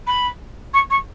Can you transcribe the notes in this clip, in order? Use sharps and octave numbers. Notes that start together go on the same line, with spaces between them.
B5
C#6
C#6